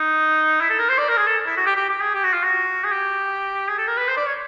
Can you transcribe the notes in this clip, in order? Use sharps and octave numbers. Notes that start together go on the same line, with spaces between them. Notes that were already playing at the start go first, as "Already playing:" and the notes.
Already playing: D#4
E4
A4
A#4
C5
D5
A#4
G#4
A4
E4
F#4
G4
G4
G4
G#4
G4
F#4
F4
F#4
G#4
G4
G#4
A4
A#4
B4
C5
D5
C#5